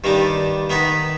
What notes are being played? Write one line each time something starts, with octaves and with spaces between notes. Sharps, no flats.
G2 D#3 G3 D4
D#3 B3 D#4 B4